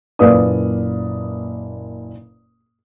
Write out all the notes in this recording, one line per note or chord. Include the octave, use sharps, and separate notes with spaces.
F#1 A#2 B4 D5 F5 D#6